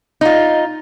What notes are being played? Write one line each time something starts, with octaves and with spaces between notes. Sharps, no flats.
D#4 F4